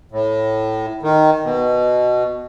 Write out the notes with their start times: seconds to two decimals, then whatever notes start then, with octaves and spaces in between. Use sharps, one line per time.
0.12 A2
1.02 D#3
1.44 B2